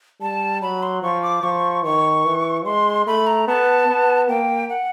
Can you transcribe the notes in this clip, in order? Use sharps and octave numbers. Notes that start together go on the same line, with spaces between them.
G3 A5
F#3 B5
C6
F3 C#6
D6
F3 C#6
D#3 C#6
E3
G#3 C6
A3 B5
A#5
B3 A5
B3
A#3 G5
F#5